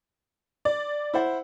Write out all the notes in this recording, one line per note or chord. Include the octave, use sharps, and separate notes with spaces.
D5
E4 C5 F#5